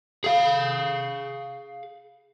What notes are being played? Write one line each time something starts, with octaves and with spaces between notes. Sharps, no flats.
G#4 F5